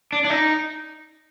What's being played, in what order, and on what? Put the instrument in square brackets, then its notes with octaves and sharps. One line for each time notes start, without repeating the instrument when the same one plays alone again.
[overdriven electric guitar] D4
D4
D#4